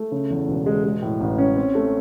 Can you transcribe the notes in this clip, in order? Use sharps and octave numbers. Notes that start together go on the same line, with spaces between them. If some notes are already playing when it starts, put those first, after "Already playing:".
Already playing: A3
C#3
E2
E1
G#3
G#3
A2
A1
C#4
C4
A3